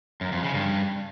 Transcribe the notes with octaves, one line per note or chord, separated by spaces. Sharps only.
F#2
F2
C#3
G2